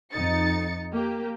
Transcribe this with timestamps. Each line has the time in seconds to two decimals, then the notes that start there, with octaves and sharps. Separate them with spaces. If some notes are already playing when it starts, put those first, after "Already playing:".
0.12 F2 D#4 A6 C#7
0.93 A#3 G4